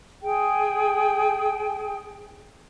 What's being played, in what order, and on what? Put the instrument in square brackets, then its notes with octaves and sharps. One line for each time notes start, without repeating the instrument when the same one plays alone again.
[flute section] G#4 G5